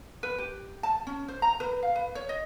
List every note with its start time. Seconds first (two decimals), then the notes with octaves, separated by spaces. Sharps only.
0.23 B4
0.38 G4
0.83 A5
1.07 C#4
1.28 C5
1.42 A#5
1.60 B4
1.83 F5
1.96 B4
2.15 C#5
2.29 D#5